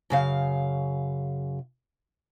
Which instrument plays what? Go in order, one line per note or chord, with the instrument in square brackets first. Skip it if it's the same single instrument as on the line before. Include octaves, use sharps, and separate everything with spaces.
[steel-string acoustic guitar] F#2 C#3 F5